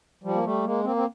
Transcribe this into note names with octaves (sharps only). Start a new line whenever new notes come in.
F3 G3
A#3
G3 A3
G#3 A#3
A#3 C4
C4